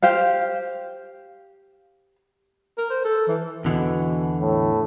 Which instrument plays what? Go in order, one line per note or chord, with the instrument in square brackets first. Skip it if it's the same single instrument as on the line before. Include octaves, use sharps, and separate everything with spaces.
[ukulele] G4 C5 F5
[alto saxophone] A#4
C5
A4
E3
[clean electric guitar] E2 D3 E3 [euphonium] B2
[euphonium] A2